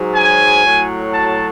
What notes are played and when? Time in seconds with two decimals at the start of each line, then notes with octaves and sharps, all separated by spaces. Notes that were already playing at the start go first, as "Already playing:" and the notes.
Already playing: G#2 F#3
0.15 G#5
0.64 A2 F#3
1.13 A5